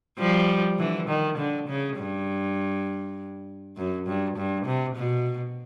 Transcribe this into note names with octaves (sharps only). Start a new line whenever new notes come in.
F3 G3
D3 E3
D#3
D3
C#3
G2
F#2
G2
G2
C3
B2